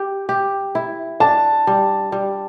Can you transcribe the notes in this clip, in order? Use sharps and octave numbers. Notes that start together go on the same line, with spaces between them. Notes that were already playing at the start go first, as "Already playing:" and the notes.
Already playing: G4
G4
E4
D4 A5
G3
G3